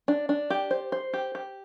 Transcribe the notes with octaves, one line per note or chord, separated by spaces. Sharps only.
D4
D4
G4
C5
C5
G4
G4